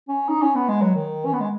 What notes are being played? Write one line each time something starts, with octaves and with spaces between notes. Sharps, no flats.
C#4
D#4
C#4
B3
G#3
F#3
D#3
C#4
B3
G#3